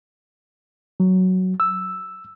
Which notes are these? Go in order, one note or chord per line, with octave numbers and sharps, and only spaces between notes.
F#3
E6